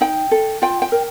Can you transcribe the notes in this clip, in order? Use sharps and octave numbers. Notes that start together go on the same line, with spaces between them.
D#4 G5
A4
F4 G5
G5
A#4